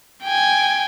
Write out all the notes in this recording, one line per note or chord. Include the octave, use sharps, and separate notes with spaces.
G5 G#5